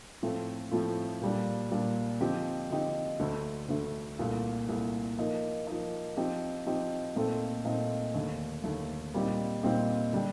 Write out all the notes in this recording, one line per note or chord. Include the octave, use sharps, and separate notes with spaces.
A2 F3 A3 C4 F4
A2 F3 A3 C4 F4
A#2 G3 D4
A#2 G3 D4
D3 F3 C4 D#4 G4
D3 F3 C4 D#4 G4
D2 D3 A3
D2 D3 A3
C2 A#2 A3
C2 A#2 A3
F3 A#3 D#4
F3 A#3 D#4
F3 C4 D#4 G4
F3 C4 D#4 G4
A#2 A3 C4 D#4 A4
A#2 A3 C4 D#4 A4
D#2 D3 A3
D#2 D3 A3
A#2 G3 C4 D#4 G4
A#2 G3 C4 D#4 G4
D3 G3 D4 G4